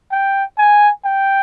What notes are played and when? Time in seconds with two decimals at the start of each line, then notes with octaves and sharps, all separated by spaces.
0.12 G5
0.58 G#5
1.05 G5